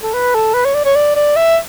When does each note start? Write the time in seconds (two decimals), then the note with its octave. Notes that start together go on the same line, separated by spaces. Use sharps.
0.03 A4
0.14 B4
0.34 A4
0.54 B4
0.65 C#5
0.75 D5
0.85 C#5
0.95 D5
1.16 D5
1.36 E5